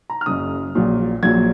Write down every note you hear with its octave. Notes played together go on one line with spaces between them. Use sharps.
A#5
F6
F#1 F#2 C#3 D#6
A#1 A#2 F#3
A#1 A#2 F#3 G#6